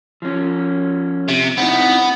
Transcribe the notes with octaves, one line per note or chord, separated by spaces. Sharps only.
F3 C#4
C3
B3 C4 D#4 E4